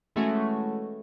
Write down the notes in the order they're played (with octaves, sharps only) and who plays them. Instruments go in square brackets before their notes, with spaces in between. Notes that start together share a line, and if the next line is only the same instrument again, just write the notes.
[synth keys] E3 G#3 A3 C#4 F#4